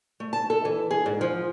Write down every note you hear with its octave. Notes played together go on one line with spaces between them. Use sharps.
A3
A5
A4
E3
G#4
G#2
F3